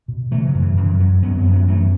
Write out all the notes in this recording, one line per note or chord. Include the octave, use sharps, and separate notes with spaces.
B2
C#3 E3 A3
F#3
F#2
E3
F#2 E3
F#2 F#3
F#2 F#3 B3
F#3 B3
F#2
F#3 B3
F#2 E3 A3